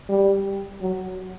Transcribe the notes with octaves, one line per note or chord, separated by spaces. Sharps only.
G3
F#3